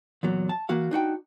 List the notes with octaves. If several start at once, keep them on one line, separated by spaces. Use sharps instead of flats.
E2 A#2 F#3
A5
E3 A#3 F#4 F5
D4 D#4 F#4 G5